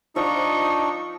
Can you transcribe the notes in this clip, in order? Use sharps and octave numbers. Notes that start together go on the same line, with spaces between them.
F3 D4 D#4 C#5 E5 C#6